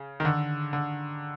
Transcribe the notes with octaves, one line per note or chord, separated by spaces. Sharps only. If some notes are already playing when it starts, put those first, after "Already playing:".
Already playing: C#3
D#3
D3
D3